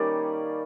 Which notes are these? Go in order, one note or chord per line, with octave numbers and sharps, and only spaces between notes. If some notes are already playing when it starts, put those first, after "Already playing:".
Already playing: D#3 G3 A#3 C#4 D5